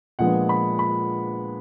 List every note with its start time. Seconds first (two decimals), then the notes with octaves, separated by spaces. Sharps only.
0.19 A#2 F3 G#3 B3 D4 F#5
0.49 B5
0.79 B5